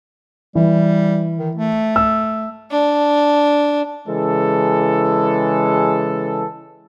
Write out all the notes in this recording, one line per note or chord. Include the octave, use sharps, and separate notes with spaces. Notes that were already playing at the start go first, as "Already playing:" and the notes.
E3 G3
D#3
A3
E6
D4
C#3 E3 G#3 A4